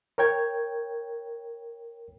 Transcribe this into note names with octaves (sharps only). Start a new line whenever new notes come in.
A#4 C#5 G5 G#6